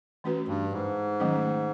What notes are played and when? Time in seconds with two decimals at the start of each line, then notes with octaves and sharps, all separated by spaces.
0.24 E3 A3 C#4 F#4 B4
0.48 G2
0.72 G#2
1.20 D#3 F#3 A3 C#4